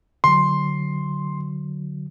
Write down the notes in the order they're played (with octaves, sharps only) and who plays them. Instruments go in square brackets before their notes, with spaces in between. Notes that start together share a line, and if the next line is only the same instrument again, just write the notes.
[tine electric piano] D3 F#3 [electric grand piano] C6